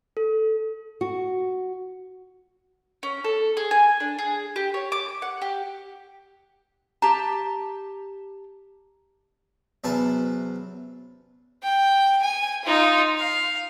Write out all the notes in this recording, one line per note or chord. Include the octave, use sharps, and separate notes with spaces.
A4
F#4
C#4
A4
G#4
G#5
D4
G#4
G4
C#5
D6
F#5
G4
G4 A5 A#5
E2 C3 F#3 C#4 B4 A5
G5
G#5
D#4 F4
F5